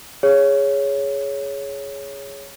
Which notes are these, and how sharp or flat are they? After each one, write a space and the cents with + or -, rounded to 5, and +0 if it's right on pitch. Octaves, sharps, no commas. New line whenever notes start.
G#4 +0 C#5 +5